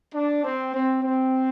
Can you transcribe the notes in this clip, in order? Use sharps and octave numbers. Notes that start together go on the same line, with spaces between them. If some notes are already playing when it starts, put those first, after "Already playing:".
D4
C4
C4
C4